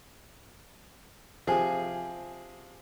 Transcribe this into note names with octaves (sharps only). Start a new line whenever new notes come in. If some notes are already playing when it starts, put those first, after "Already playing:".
C3 F3 G#4